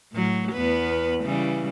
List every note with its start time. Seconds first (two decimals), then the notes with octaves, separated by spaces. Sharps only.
0.12 A2 F#3
0.52 E2 B3 B4
1.23 C#3 E3 G3